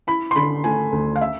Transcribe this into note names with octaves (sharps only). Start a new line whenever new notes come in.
E4 B5
C6
D3 B5
A3 G#5
D2
F5
E5